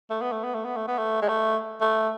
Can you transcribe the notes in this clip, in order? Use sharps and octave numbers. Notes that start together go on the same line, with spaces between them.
A3
B3
A3
B3
A3
B3
A3
B3
A3
G#3
A3
A3